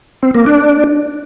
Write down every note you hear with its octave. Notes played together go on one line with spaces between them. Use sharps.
C4
A#3
D4